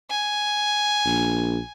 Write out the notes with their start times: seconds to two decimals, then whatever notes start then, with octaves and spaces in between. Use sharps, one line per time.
0.10 G#5
1.06 A#1